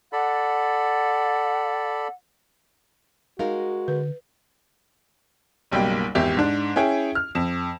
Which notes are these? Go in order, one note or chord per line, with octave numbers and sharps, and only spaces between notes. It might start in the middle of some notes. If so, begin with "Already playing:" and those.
A4 D5 F#5 B5
G#3 D#4 F#4 A#4 F5
D3 B4
F#1 B1 G3 A#3 G5
G#1 E2 G4 E5
G#2 D4
C#4 E4 G#4 G5
F6
F2 E7